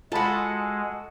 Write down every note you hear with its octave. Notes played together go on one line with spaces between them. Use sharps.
G#3 F4 F#4 A4 A5 B5